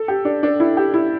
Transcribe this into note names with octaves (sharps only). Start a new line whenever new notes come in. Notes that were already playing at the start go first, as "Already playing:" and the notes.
Already playing: A4
G4
D4
D4
E4
G4
E4